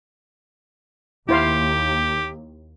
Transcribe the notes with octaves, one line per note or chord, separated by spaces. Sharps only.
D#2 E4 G4 C5 F5